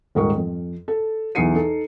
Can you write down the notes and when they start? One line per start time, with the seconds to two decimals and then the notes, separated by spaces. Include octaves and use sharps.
0.15 D#1 G#2 A#4 C#6
0.37 F2
0.88 A4
1.35 B1 E2 D#4 C7 C#7 D#7
1.55 D#4 A4